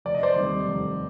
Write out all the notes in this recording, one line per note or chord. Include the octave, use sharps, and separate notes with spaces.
F1 D5
D#5
C5 D5
D#2 D#3 G3 C4
F1